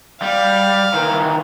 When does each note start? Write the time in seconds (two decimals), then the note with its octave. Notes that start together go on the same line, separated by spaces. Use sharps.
0.22 G3 F5
0.94 D#3 E3